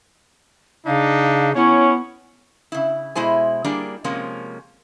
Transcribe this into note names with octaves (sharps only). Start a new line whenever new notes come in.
C#3 D4 D#4 F5
B3 C#4 E4 C#5
C#3 E4
B2 G#3 E4 C5 G#5
G3 A#3 D4 G#4 D5 A#5
C3 F3 G#3 A#3 C#4